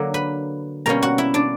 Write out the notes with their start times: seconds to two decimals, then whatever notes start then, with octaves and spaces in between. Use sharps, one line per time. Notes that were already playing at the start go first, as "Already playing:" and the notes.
Already playing: D3 F#3 A#3
0.14 B4 B5
0.86 B2 G3 A#3 C#4 A#4 A#5
1.02 F#4 F#5
1.18 E4 E5
1.34 D4 D5